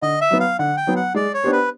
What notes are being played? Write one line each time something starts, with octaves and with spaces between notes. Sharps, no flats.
D3 D#5
E5
F#3 B3
F5
D3 F#5
G5
F#3 B3
F#5
G#3 D5
C#5
B3 D4 G4 C5
B4